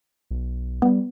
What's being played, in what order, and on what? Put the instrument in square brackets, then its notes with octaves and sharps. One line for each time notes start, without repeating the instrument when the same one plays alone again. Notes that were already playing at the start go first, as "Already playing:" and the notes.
[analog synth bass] B1
[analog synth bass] G3 [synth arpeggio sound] B3